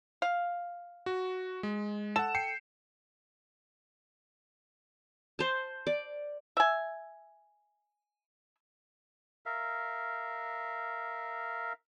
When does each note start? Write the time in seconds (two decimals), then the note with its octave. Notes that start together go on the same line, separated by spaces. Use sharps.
0.22 F5
1.06 F#4
1.63 G#3
2.16 A4 F#5 E7
2.35 G5 C7 C#7
5.39 C5 A5
5.87 D5
6.57 E5 G#5
9.46 A#4 E5 F5